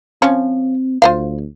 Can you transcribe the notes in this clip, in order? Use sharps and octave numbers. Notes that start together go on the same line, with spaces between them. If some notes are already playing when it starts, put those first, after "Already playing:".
F3 C4 C#4 C#5
D2 F4 C5 F5